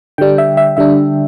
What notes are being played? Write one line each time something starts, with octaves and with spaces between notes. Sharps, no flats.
D3 G3 D4 G5
E5
E5
D3 G3 D4 E5